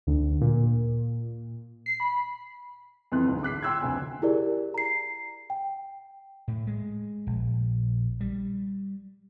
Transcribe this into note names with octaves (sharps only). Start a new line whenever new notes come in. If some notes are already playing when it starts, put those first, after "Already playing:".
D2
A#2
C7
B5
F2 E3 C6 F#6
A1 D2 G#2
D6 F#6 B6 C7
G5 C6 E6 F#6 G#6
F1 D2 G#5
E4 G4 G#4 A#4 D5
A#5 C7
G5
A2
G#3
A#1
G3